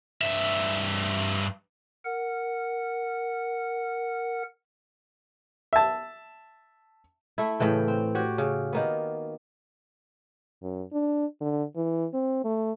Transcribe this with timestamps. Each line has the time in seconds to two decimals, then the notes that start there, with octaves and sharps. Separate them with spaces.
0.21 G2 E5
2.05 A#4 F#5
5.73 E5 A5
7.38 A3 E4
7.60 A2 C#3 E3 G5
7.88 C4
8.15 F#4 G4 C#5
8.38 C#3
8.73 D#3 A#3 B3
10.63 F#2
10.93 D4
11.41 D3
11.76 E3
12.14 C4
12.45 A3